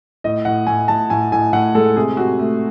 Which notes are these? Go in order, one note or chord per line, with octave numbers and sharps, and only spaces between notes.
A2 D#5
A2 F#5
A2 G#5
A2 A5
A2 G#5
A2 G#5
A2 F#5
G#3 A4
C3 G#4
C3 F#4
A3